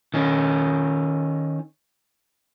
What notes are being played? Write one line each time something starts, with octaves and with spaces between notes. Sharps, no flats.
D#3 C#4